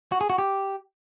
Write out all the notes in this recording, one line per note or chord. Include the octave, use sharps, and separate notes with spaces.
F#4
G#4
F#4
G4